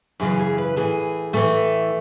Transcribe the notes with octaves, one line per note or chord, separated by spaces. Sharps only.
F#2 C#3 E3 G#4
G#4
B4
A2 E3 G#4
A2 E3 A3